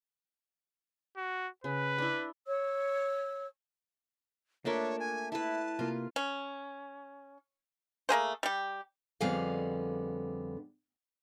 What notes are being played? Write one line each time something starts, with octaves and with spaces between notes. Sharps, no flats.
F#4
C#3 B4
D4 E4
C#5 E6
A3 A#3 D4 F4 A#4 C#5 E5
G#5
E4 B4 A5
C3 A#3 F4
C#4
A3 A#3 G#4 C5
G3 G4
F2 D3 G3 B3 G#4 F5